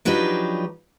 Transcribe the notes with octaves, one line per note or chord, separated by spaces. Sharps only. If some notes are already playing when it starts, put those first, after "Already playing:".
F3 F#3 D4 D#4 G4 B4